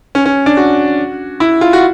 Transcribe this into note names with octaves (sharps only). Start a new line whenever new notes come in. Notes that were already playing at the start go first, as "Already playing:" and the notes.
C#4
C#4
D4
F#4
E4
F4
F#4